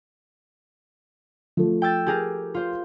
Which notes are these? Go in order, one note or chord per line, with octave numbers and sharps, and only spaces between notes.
F3 A3
G5 E6 A6
G4 G#4 A#4
F4 C5